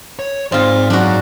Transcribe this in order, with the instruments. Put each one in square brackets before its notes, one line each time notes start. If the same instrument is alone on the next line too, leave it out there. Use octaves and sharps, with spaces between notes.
[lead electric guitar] C#5
[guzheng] G#2 F4 [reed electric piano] C4 C5 [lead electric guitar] D5 F5
[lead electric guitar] F#2 [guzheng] D4 F#4